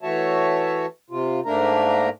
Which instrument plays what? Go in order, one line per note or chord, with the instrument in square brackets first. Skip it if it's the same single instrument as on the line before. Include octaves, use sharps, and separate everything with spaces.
[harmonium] E3 A3 F#4 C#5 E5 A5
C3 F4
G#2 A3 A#3 D4 A#4 A#5